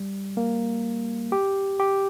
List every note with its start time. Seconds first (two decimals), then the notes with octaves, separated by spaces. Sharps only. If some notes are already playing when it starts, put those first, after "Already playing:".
Already playing: G3
0.37 A#3
1.32 G4
1.80 G4